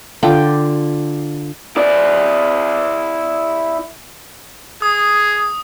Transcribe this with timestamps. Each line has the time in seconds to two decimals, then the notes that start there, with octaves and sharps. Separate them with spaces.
0.23 D3 F4 D5 G5
1.77 E4 D5
4.82 G#4 D#6